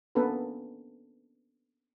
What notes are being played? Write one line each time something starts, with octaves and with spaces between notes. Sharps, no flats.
A#3 B3 C#4 D4 A4 B4